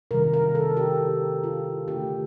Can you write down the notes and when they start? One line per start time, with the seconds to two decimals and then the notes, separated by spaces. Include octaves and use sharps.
0.11 C3 D#3 G3 A#4
0.33 A#4
0.55 A4
0.77 G4
1.44 F4
1.88 D3 A3 G4